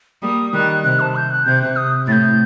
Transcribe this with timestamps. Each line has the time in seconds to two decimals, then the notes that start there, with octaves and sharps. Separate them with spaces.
0.22 G3 A#3 D#6
0.53 D#3 G3 F#6
0.84 C3 F#6
1.00 A5
1.15 G6
1.30 F#6
1.46 C3 G6
1.62 F#6
1.76 D#6
2.07 A2 A6
2.12 G6